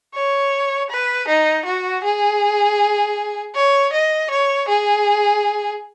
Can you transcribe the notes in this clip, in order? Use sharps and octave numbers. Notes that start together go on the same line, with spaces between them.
C#5
B4
D#4
F#4
G#4
C#5
D#5
C#5
G#4